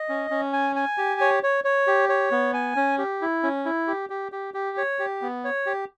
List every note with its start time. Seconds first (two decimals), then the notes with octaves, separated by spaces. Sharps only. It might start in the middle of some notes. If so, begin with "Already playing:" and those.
Already playing: D#5
0.09 C#4
0.31 C#4
0.53 G#5
0.76 G#5
0.98 G4
1.21 C#5
1.43 C#5
1.64 C#5
1.87 G4
2.09 C#5
2.31 B3
2.54 G#5
2.76 C#4
2.98 G4
3.22 E4
3.43 C#4
3.65 E4
3.87 G4
4.10 G4
4.32 G4
4.54 G4
4.77 C#5
4.99 G4
5.22 B3
5.44 C#5
5.66 G4